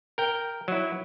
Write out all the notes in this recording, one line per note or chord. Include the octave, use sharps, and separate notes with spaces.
A#4 G5
F#3 E4